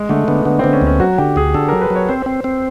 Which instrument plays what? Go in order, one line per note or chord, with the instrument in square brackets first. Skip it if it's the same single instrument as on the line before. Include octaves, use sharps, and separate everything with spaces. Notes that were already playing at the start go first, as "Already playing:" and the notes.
Already playing: [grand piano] G#3
[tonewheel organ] D3 [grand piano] A3
[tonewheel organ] D3 [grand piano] B3
[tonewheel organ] D3 [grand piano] B3
[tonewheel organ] D3 [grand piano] C4
[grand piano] C#4
[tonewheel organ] D2
[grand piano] C#4
[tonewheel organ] F#3 [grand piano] F#4
[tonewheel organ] D3 [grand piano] G4
[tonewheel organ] D2 [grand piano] G#4
[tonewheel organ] D3 [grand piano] A4
[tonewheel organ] F#3 [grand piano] A#4
[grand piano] B4
[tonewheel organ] F#3
[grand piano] C#5
[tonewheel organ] C4 [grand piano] C5
[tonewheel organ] C4
C4